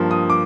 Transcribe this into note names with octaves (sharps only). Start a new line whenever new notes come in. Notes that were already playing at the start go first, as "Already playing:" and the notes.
Already playing: G2 F3 A#3
D#6
D6